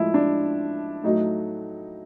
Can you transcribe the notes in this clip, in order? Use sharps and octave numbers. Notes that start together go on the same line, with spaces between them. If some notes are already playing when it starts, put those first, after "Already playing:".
Already playing: A2 F3 G#3 E4
D4
A2 F#3 A3 D#4